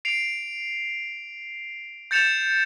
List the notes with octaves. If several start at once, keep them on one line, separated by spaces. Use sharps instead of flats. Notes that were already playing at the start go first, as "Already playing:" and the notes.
C7 D7 F7
G6 A6 C#7 E7 F7